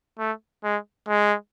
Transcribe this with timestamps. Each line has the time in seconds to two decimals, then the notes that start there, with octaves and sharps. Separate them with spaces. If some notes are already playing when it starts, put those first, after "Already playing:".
0.19 A3
0.64 G#3
1.08 G#3